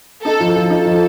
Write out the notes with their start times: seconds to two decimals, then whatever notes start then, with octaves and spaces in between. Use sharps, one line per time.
0.24 D#4 A4
0.40 F3
0.54 F3 A4
0.70 D#4
0.85 F3